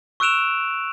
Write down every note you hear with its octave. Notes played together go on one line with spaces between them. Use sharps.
C#6 E6 F#6 D7 E7 F7